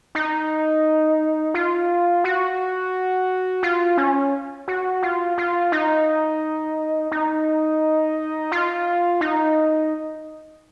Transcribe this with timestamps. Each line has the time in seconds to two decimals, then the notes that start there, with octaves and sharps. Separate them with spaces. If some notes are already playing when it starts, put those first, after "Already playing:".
0.15 D#4
1.54 F4
2.24 F#4
3.63 F4
3.97 C#4
4.68 F#4
5.02 F4
5.38 F4
5.72 D#4
7.11 D#4
8.52 F4
9.21 D#4